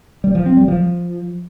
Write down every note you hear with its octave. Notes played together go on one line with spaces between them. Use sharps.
G3
F3
C4
G3
F3